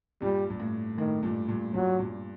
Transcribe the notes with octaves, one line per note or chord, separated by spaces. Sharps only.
G2 A#2 G3
G2
A2
A2 D#3
G2 A#2
G2 A#2
G2 A#2 F#3
G2 A#2